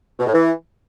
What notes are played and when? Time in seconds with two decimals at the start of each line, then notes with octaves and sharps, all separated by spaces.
0.19 B2
0.26 A2
0.34 E3